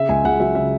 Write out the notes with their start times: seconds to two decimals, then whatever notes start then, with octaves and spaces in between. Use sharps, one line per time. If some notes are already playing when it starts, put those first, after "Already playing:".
Already playing: C#3 E5
0.09 C#2 G#5
0.24 C#2 F#5
0.40 F#3 E5
0.55 C#3 E5